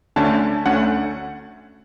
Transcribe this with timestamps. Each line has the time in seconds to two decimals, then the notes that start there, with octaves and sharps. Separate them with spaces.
0.16 D2 D3 A3 C#4 A5
0.66 D2 D3 A3 C#4 F#5